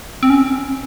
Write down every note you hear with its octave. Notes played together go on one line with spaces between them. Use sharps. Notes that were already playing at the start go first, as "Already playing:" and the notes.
C4
C#4